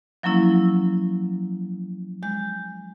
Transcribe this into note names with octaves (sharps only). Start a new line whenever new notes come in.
F3 F#3 A#3 C#4 E4
G#3 G6